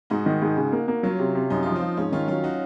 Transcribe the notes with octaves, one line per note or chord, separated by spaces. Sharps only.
G#2 D#4 F#4
D#3
G#2
C#3
A#3
A#3
F#3 C#4 F4
C3
C3
F#2 D#4
F3 F4
C4 D#4
F3
G#2 C#4
D#3 C#4 F4
F#3 C#4 F4
D#4 F#4